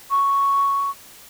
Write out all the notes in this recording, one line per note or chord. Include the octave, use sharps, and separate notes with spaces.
C#6